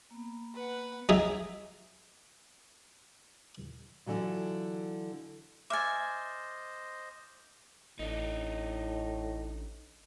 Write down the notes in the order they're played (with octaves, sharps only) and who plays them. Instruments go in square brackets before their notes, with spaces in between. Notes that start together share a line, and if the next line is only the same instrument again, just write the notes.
[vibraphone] A#3 B3
[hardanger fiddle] B4 F#5
[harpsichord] F#3 D#4 G#4 E5
[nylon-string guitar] D3 E3 F#3 F4
[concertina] C5 D#5 [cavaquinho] E5 G#5 [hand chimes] D6 F6 A6
[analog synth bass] A1 [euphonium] A2 [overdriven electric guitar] D4 D#4 [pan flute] D#5